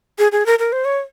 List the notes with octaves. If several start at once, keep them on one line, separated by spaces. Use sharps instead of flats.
G#4
G#4
A#4
A#4
C5
C#5